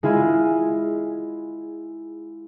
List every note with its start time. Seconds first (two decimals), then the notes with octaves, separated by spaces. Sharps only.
0.03 G#3 E4 F4 G#5